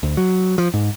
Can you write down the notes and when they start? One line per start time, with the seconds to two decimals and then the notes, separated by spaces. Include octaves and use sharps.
0.03 D2
0.17 F#3
0.58 F3
0.74 G#2